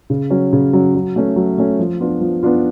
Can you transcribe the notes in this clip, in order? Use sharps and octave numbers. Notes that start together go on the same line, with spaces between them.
C#3
F#3 C#4
C#3
F#3 C#4
F#3
A3 C#4
F#3
A3 C#4
F3
B3 D4 F4
F3
B3 D4 F4